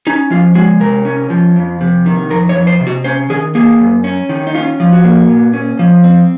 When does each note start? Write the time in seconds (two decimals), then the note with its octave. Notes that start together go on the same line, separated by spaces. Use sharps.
0.07 C#4 D#4
0.30 F3 F4
0.55 G#3 F#4
0.80 C3 A#4
1.05 C#4
1.30 F3
1.56 F2
1.81 C3
2.06 D#3
2.30 F2 A#4
2.49 C#5
2.55 F2
2.67 C5
2.81 C3
2.87 F#4
3.04 C#4 C5
3.30 D#3 G#4
3.55 A#3 G#4
3.80 F#2
4.04 C#4
4.29 D#3
4.47 D#4
4.54 C#4 F4
4.80 F3
4.92 F#4
5.04 A#3
5.30 A#2
5.54 C#4
5.79 F3
6.04 C4